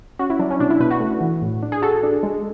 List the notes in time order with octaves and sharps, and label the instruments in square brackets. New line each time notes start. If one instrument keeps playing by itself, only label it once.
[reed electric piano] C#4 [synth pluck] F#4
[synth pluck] E4
[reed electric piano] F#3 [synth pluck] D4
[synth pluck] C#4
[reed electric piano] B2 [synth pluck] D4
[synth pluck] E4
[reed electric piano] B2 [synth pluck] B4
[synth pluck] F#4
[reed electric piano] A3
E3
A2
D4
[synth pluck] G#4
[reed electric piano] F#4 [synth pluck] A4
[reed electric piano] D4
G#3